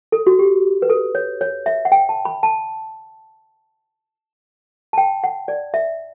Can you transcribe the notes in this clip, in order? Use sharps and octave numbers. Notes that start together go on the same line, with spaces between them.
A4
F#4
G4
B4
A4
C#5
C#5
E5
F#5
G5
A5
B5
A5
A5
G5
F#5
D5
E5